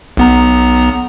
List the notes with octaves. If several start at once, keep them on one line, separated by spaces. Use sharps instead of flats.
B1 B3 A#5